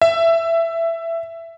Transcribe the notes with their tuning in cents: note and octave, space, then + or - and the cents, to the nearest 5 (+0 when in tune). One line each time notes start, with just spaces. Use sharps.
E5 +15